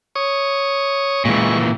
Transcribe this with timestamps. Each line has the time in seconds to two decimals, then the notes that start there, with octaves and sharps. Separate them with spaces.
0.15 C#5 C#6 D#6
1.25 A#2 E3 G#3 C#6